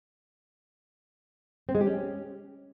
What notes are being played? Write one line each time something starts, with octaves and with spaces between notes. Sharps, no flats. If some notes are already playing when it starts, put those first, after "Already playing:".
C4
G#3
G4
C#4